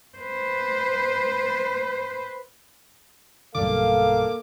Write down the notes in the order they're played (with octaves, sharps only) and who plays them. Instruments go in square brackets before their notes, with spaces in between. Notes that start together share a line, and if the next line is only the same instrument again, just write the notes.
[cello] B4 C5
[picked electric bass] B1 G2 D3 [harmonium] A#3 F5 [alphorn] A4 [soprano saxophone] D6